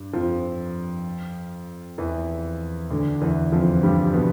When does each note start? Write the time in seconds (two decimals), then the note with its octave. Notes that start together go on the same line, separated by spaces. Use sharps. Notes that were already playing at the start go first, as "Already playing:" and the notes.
Already playing: G2
0.13 F2 F3
1.98 E2 E3
2.90 D2 D3
3.21 E2 E3
3.52 F2 F3
3.83 G2 G3
4.14 B2 B3